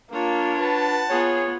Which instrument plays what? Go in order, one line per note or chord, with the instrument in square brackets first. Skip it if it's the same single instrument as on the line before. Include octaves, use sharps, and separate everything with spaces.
[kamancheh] A#3 [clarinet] D4 [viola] F4 C#5
[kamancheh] B4 [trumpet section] F#5 A5
[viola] B3 F4 [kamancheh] G#4 [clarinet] C#5